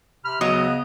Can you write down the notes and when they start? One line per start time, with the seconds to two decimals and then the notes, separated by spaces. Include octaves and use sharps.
0.25 C3 B5 F6
0.41 D2 C#3 F#3 B3 D#5 D#6